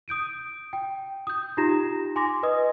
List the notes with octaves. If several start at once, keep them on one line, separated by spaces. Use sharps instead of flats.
D#6 G6 D7 D#7
G5
D#6 G6
D#4 F4 G4 A#5 A#6 E7
G#5 C6 D6 A#6
B4 D#5 D#6